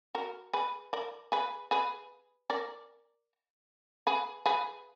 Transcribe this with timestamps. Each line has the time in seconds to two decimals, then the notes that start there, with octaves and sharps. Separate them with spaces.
0.15 F#4 A#4
0.53 G#4 B4
0.93 A#4 D5
1.32 G#4 B4
1.71 G#4 B4
2.50 A#4 D5
4.07 G#4 B4
4.46 G#4 B4